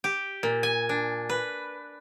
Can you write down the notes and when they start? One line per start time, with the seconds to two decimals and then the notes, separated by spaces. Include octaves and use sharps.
0.04 G4
0.43 A#2
0.63 G#5
0.89 D4
1.30 B4